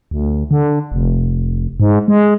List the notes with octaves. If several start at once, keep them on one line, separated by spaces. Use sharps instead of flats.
D2
D3
F1
G#2
G#3